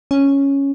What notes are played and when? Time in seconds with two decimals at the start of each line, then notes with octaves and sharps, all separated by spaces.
0.11 C#4